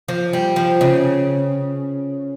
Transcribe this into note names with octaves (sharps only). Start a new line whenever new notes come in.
F3
G3
F3
C#3